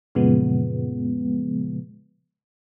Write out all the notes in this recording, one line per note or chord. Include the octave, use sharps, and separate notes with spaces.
F#2 A#2 C#3 F3 G#3 B3